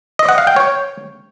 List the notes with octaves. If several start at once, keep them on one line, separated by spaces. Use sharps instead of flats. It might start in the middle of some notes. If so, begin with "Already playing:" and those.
D#5
F#5
F5
G5
C#5